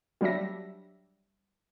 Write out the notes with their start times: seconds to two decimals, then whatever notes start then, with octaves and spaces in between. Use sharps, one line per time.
0.21 F#3 G3 D4 E5 A#6